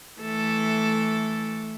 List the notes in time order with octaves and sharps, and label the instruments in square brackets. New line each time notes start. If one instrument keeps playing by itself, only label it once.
[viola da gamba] E3 A3 A4